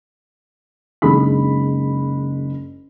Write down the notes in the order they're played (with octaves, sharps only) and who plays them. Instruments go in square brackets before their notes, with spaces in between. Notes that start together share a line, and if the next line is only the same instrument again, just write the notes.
[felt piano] F#1 G#3 D4 D#4 B5